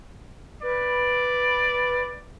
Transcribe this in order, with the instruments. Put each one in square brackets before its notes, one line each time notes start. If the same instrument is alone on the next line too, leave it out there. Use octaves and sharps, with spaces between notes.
[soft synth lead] B4 [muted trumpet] D5